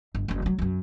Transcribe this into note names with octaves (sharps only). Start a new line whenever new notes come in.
G1
F#1 C4
F#3 G3
F#2 F#3